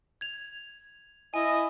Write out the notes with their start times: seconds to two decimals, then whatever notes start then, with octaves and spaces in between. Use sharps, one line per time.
0.21 G#6 F7
1.34 E4 D#5 G#5